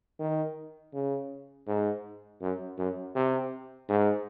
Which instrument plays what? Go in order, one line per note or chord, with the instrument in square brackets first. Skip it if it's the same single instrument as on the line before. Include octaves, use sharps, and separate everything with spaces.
[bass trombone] D#3
C#3
G#2
F#2
F#2
C3
G#2